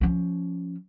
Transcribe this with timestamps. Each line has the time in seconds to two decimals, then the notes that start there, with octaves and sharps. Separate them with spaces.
0.01 F3 C#4